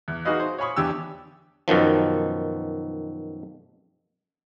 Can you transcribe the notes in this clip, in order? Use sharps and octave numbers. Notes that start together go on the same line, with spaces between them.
E2
D#4 F#4 G#4 B4 D#5 F5
C5
C#5 F5 G#5 B5 C#6 D#6
E2 D4 G4 E6
F#2 B2 D#3 F3